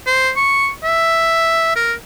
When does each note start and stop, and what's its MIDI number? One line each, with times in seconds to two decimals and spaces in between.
0.06 0.31 72
0.36 0.69 85
0.84 1.72 76
1.76 1.93 70